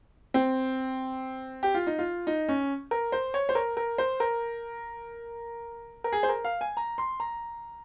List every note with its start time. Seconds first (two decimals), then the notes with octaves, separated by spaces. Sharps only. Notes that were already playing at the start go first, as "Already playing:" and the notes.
0.34 C4
1.63 G4
1.74 F4
1.87 D#4
1.99 F4
2.27 D#4
2.49 C#4
2.91 A#4
3.12 C5
3.34 C#5
3.49 C5
3.55 A#4
3.77 A#4
3.98 C5
4.20 A#4
6.04 A#4
6.12 G#4
6.23 C5
6.29 A#4
6.44 F5
6.61 G#5
6.77 A#5
6.98 C6
7.20 A#5